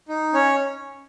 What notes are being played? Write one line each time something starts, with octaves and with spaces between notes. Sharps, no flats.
D#4
C#4 C#5